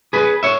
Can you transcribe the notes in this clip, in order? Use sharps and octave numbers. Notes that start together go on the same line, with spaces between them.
G#4 B4
C#5 E5